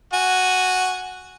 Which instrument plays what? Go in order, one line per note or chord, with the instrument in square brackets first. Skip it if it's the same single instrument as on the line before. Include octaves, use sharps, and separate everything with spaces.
[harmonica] F#4 G#5